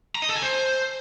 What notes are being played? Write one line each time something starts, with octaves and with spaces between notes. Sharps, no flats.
A#5
D#5
A4
G#5
C5